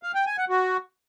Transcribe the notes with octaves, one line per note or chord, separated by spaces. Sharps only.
F5
G5
G#5
F#5
F#4